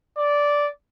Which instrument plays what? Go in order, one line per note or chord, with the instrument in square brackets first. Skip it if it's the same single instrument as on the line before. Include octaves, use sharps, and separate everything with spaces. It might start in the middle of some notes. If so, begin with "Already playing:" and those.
[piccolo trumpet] D5